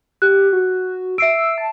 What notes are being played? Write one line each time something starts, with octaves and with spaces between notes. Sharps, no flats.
G4 F#6
F#4
E5 E6 C7 D7
A5